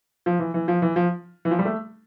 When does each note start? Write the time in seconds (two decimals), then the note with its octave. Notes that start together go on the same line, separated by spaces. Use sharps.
0.26 F3
0.39 E3
0.54 E3
0.68 F3
0.82 E3
0.96 F3
1.45 E3
1.51 F3
1.59 G3
1.65 A3